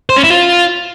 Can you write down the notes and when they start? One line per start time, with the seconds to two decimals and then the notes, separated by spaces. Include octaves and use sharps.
0.10 C5
0.16 C#4
0.23 E4
0.30 F4